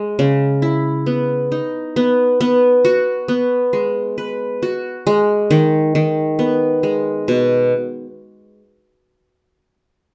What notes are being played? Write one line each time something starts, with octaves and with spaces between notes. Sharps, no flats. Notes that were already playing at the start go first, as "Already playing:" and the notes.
Already playing: G#3
C#3
E4
B3
D#4
B3
B3
F#4
B3
G#3
B4
F#4
G#3
D#3
D#3
B3
G#3
B2